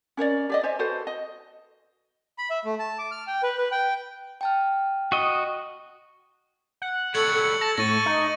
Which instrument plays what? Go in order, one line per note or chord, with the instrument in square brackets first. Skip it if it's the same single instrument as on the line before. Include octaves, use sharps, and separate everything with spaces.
[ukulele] C#4 A#4 C#5 D5
G4 D5 D#5
C5 D5 E5 G#5
F#4 A4 B4 C5
D#5
[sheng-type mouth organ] B5
E5
A3
A5
D6
F6
G5
B4
B4
G5
[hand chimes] G5 A5 F6
[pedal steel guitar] F#4 D#5
[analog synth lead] F#5
[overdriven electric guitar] G3 C#5 [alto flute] A4 [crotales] G#6 C#7 F#7
[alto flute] A4
[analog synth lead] A5 [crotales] A#6
[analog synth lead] A2 [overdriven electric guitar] A4 [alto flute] C#6 [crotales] A#6 D#7
[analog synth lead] D#4